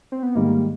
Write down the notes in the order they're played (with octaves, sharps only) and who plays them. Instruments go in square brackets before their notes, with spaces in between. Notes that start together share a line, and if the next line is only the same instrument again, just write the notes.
[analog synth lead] C4
B3
[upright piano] G#2 D#3 G3 [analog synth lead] A#3